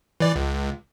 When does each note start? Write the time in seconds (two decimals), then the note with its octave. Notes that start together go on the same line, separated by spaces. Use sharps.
0.20 E3 D5
0.36 C#2